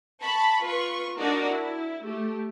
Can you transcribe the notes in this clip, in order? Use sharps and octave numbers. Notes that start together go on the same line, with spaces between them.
A5 B5 C#6
F4 B4 C#6
D4 D#4 F#4 A#4 D5
E4
A3 G4